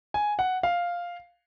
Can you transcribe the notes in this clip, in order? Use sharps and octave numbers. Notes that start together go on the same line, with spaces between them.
G#5
F#5
F5